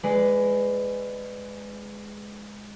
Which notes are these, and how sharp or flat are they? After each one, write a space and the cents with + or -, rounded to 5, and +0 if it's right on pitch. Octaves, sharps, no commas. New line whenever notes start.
G#3 +0 B4 +20 D5 +0